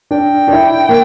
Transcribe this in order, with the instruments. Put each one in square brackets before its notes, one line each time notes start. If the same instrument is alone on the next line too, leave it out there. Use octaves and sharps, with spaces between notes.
[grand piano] D4 [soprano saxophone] G5
[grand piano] D4
E4
A#3